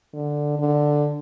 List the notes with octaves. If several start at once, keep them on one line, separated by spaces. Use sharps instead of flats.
D3
D3